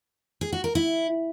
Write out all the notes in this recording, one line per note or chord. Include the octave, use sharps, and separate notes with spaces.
G#4
F#4
A#4
E4